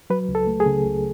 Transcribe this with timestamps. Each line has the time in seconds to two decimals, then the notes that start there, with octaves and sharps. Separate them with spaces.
0.10 F#3 B4
0.29 C#2
0.35 A4
0.47 A3
0.60 G#4
0.66 C#3
0.85 C#2